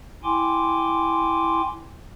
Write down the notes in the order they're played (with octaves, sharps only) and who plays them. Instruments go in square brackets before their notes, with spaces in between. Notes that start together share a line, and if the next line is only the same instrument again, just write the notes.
[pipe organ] E4 G5 G#5 C6 D6